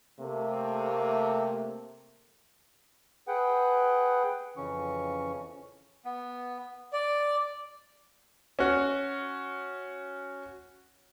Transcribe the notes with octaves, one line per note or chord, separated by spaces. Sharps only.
C3 A3 A#3
G#4 B4 F#5 G5
F2 C#3 E3 C#4 C#6
B3
D5
C#4 F#4